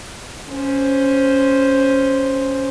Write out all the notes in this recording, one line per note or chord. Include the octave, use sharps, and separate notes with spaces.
C#4 C5